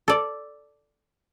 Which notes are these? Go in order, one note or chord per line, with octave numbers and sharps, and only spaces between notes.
A4 D5